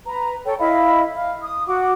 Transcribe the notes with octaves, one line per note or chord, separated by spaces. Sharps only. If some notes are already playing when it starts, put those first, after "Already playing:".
B4 A#5
A4 C#5 G5
E4 D#5 F5 B5
F5
D#6
F#4 F#5 D6